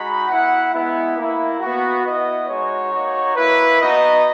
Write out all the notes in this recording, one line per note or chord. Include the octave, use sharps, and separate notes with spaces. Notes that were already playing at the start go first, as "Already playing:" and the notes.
Already playing: G#3 D#4 F#4 B5
B3 E4 F#5
G#3 B3 E4
A#3 E4
B3 F#4
B3 E4 D#5
G#3 D#4 F#4 C#5
A#3 D#4 F#4
A#3 E4 B4
B3 D#4 F#4 D#5